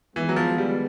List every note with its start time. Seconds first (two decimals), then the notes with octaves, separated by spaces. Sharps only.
0.16 D#3 E3 G#3 B3
0.29 F#3
0.36 F3
0.58 G3